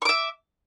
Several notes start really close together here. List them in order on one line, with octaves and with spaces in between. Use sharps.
C#6 D6 E5